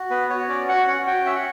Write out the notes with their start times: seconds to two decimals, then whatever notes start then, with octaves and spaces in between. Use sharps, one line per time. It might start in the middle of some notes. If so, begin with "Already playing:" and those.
Already playing: F#4
0.10 B3 B4
0.30 F#4 C#5
0.49 C#4 D5
0.68 F#4 F#5
0.87 C#4 F#5
1.07 F#4 G5
1.26 C#4 E5
1.36 F#5